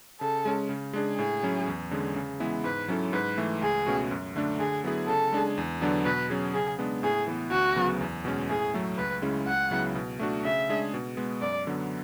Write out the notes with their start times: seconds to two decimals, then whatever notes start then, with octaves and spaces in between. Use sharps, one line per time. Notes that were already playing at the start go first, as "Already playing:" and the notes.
0.21 C#3 A4
0.45 G#3 C#4
0.69 C#3
0.93 G#3 D4 G#4
1.18 A2 G#4
1.43 F#3 C#4 E4
1.68 E2
1.91 D3 G#3 C#4 G#4
2.16 C#3
2.40 E3 G#3 B3 E4
2.64 G#2 B4
2.88 F#3 C#4 E4 A4
3.13 G#2 B4
3.38 E3 A3
3.61 C#2 G#4
3.86 B2 A3 C#4 F#4
4.11 F#2
4.36 D3 A3 D4
4.59 D3 G#4
4.84 F#3 B3 E4 G#4
5.08 C#3 A4
5.33 G#3 D4 G#4
5.58 E2
5.81 D3 F#3 B3 D4
6.05 B2 B4
6.30 F#3 C#4 G#4
6.54 C#3 G#4
6.79 G#3 B3 D4
7.03 A2 G#4
7.27 E3 B3
7.51 D2 F#4
7.76 C#3 F#3 B3
8.01 E2
8.25 B2 G#3 C#4
8.49 A2 G#4
8.74 F#3 A3
8.98 C#2 B4
9.22 C#3 G#3 C#4 E4
9.47 C#2 F#5
9.71 C#3 F#3 B3 E4
9.95 B2
10.19 A3 D4 F#4
10.44 C#3 E5
10.69 G#3 D4 G#4
10.94 B2
11.17 G#3 B3
11.41 F#2 D5
11.67 D3 F#3 B3